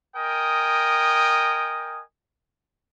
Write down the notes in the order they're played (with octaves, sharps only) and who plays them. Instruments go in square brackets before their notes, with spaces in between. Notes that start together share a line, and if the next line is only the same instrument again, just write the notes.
[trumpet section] A#4 D#5 G5 G#5 D#6